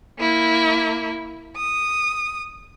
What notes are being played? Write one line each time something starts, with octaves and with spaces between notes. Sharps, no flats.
A#3 E4
D#6